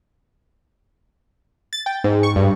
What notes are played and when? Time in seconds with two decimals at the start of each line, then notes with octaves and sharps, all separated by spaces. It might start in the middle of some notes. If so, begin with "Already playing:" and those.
1.73 A6
1.86 G5
2.04 G#2
2.23 C#6
2.36 G2